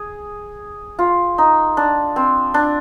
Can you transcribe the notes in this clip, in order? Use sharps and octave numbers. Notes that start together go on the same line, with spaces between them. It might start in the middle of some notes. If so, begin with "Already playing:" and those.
Already playing: G#4
F4
D#4
D4
C4
D4